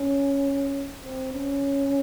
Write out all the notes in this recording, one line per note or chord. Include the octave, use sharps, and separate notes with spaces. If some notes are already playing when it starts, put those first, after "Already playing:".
Already playing: C#4
C4
C#4